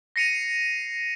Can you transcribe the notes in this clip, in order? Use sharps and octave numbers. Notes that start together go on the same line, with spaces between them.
A#6 C7 C#7 D#7 F7